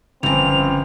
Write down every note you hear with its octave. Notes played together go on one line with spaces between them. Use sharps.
G1 F2 C#3 C4 F7